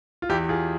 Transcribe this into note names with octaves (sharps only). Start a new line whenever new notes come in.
F4
E2 E4 G4
F4 G#4